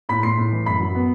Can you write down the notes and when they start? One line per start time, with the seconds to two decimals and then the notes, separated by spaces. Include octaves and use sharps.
0.09 A2 B5 B6
0.23 A2 C6 C7
0.37 A2
0.52 E3
0.66 F#2 B5 B6
0.80 F#3
0.95 B3